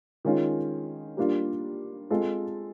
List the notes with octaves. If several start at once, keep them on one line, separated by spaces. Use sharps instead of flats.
D#3 G#3 C#4 F4
G3 A#3 D4 F4
G#3 C4 F4 A4